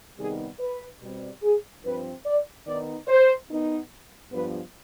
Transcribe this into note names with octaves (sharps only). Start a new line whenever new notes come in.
C3 D#3 G3 B3 D#4 G#4
B4
B2 G3 C4
G#4
G2 F3 C4 B4
D5
D#3 B3 D#4 D5
C5
D#3 B3 D#4
G2 F3 B3 B4